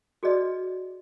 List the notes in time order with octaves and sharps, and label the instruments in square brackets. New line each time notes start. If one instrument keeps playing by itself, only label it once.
[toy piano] F#4 G#4 B4 D5 D#5